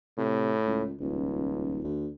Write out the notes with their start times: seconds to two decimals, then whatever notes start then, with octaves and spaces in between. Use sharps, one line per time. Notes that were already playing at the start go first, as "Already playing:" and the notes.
0.18 A2 C3
0.66 C#2
1.00 D#1 C#2
1.84 D2